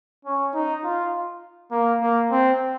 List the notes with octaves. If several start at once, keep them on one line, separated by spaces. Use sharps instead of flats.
C#4
D#4
F4
A#3
A#3
C4